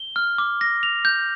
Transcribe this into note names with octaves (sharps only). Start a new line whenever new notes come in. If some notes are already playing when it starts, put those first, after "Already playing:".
Already playing: G7
F6
D6
A#6
F7
G6